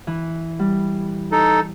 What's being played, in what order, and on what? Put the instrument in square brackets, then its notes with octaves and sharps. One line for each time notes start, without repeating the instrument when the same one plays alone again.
[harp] E3
G3
[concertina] D#4 A4